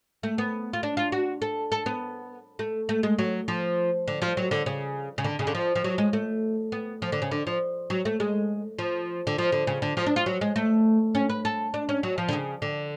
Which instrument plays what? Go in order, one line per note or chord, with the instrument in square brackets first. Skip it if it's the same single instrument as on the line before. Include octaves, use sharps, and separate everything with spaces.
[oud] A3
B3
F4
D4
F4
F#4
A4
A4
B3
A3
A3
G#3
F#3
F3
D3
F3
F#3
D3
C#3
C#3
D3
C#3
D3
F3
F3
F#3
G#3
A3
B3
F3
D3
C#3
D3
F3
F#3
A3
G#3
F3
D3
F3
D3
C#3
D3
F3
D4
F4
F#3
G#3
A3
C#4
B4
A4
D4
C#4
F#3
F3
D3
C#3
D3